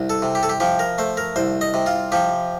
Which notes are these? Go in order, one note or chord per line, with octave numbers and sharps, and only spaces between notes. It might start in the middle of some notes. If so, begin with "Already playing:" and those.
Already playing: C2
A4
C3
G4
A4
G4
F3 G4
A#4
A3 C5
A#4
C2 C5
D#5
C3
F4
F3 G4